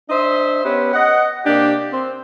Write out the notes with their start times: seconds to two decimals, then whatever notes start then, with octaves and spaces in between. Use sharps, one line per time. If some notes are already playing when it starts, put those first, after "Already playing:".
0.10 D4 C5 D#5 E5
0.65 B3 C#4 G4 B4
0.94 D#5 F#5
1.46 C3 A#3 D4 G4
1.92 C4